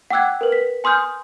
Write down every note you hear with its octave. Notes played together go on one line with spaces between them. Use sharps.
F#5 G5 D6 E6 F#6 G#6
A#4 B4
B6
G#5 C6 D#6 F6 G6